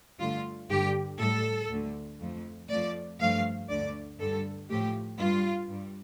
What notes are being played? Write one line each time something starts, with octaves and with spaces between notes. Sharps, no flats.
G2 D3 A3 F4
G2 D3 G3 G4
A2 G3 A4
D2 D3 A3
F2 F3 A3
F2 F3 A3 D5
G2 F3 A3 F5
D2 D3 A3 D5
G2 D3 G3 A4
A2 F3 A3 G4
G2 G3 F4
G2 G3